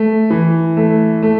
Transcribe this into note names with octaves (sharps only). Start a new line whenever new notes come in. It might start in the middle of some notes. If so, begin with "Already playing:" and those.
Already playing: A3
E3
A3
A3